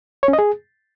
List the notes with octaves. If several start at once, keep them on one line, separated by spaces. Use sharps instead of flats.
C#5
C#4
D#5
G#4